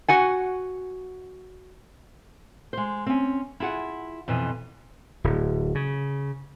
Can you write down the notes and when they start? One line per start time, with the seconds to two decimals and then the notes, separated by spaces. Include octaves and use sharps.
0.08 F#4 F#5 G#5
2.73 G#3 C5
3.06 C4 C#4
3.60 E4 F4 G#4 F#5
4.28 F2 B2 E3
5.24 D1
5.75 C#3